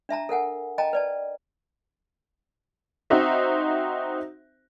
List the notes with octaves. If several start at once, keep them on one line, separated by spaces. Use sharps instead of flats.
D4 E5 A5 A#5
A4 A#4 F#5 G#5
D#5 G5 A5 A#5
B4 D5 A5
C4 D#4 F#4 C5 E5